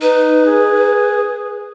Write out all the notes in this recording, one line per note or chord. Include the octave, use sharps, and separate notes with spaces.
D#4 B4
G#4